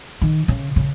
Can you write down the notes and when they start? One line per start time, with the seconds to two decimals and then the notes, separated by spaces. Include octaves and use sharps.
0.21 D#3
0.48 C#3
0.76 C#3